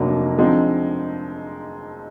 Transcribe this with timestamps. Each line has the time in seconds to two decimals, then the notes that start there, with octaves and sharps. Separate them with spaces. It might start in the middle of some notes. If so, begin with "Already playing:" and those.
Already playing: F1 D#2 D3 F#3 A#3
0.38 D3 F3 G#3 C4 D#4